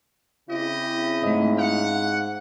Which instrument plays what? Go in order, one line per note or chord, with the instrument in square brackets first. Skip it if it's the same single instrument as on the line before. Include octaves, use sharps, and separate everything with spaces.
[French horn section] C#3 C4 E4 [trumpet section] G4 D#5
[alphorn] G#2 [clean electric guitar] A3 D#5
[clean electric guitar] F5 [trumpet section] F#5